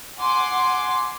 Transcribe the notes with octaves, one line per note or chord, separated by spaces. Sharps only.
F#5 G#5 C6 D6